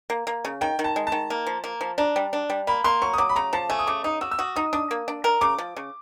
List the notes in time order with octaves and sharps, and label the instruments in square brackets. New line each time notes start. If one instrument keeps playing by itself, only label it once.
[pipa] A#3
A#3
C#3
[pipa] D#3 [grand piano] G5
[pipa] D#3
[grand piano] A5
[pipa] G#3
[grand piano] A5
[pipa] D#3
A#3
F3
A#3
F3
[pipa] D4 [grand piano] A#5
[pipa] G3
D4
G3
[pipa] A#3 [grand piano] B5
[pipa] A#3 [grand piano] C6
[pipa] F#3 [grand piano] C#6
[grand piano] D#6
[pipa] F#3 [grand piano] D6
[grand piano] B5
[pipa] C#3 [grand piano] A#5
[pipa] F3 [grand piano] A5
[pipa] A3 [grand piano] G#5
[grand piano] D#6
[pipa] C#3 [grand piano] D6
[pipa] D#4 [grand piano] D#6
[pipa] F#4 [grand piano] E6
[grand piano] E6
[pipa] F#4 [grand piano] D#6
[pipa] D#4 [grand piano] D#6
[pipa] D4 [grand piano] D#6
[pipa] A#3
D4
A#4
[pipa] C#3 [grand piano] D6
[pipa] F3
C#3